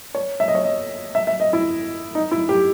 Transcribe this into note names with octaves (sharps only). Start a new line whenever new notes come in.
C#5
E5
D#5
C#5
D#5
E5
E5
D#5
E4
D#4
E4
G4